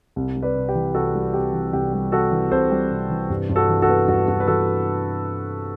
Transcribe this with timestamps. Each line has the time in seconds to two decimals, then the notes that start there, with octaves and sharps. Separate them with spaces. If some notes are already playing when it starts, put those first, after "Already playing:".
0.16 C2
0.36 G3
0.43 B4 D5
0.56 C3
0.69 G4
0.75 E3
0.94 C2 F#4 A4
1.14 G3
1.33 C3 G4
1.53 E3
1.73 C2 G4
1.93 G3
2.12 C3 F#4 A4
2.32 E3
2.51 C2 A4 C5
2.71 G3
2.91 C3
3.10 E3
3.30 G2
3.49 G2
3.56 F#4 A4
3.69 E3
3.82 F#4 A4
3.89 B3
4.08 G2 F#4
4.28 G2 F#4
4.40 B4
4.47 E3 F#4 A4